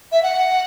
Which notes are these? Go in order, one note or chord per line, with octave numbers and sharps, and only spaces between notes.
E5
F#5